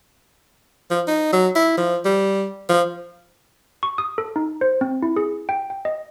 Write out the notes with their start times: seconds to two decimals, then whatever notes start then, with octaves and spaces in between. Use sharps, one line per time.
0.91 F3
1.08 D#4
1.33 F#3
1.55 E4
1.77 F3
2.05 G3
2.69 F3
3.83 C#6
3.98 D#6
4.18 A4
4.36 D#4
4.61 C5
4.81 C4
5.03 E4
5.16 G#4
5.49 G5
5.70 G5
5.85 D#5